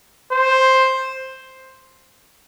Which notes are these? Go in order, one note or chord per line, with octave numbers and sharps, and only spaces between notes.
C5